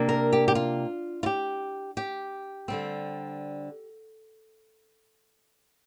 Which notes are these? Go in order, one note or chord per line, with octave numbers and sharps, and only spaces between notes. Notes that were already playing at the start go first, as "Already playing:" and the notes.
Already playing: C3 A#3 D4
A#4
G4
G4
F4
F4
G4
G4
D3 G3 C4